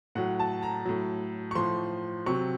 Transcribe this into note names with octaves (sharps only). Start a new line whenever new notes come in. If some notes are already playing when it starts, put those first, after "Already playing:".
A2 F#3 F#5
A5
A#5
A2 F#3
C#6
A2 F3 C6
C3 F#3 C#6